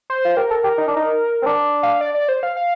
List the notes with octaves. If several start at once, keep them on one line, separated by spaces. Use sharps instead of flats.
C5
F4
G4 A#4
A4
G4
D#4
D4
D#4
C4
D4
F5
D5
D5
C5
F5
F5